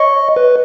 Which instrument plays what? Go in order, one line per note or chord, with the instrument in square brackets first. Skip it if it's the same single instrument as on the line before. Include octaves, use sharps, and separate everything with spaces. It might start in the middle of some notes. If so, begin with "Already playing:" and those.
Already playing: [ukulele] C#5 [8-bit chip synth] D#5
[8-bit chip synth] B4